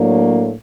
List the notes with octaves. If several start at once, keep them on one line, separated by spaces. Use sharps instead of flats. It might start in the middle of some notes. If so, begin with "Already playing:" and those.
Already playing: A2 F#3 A#3 D4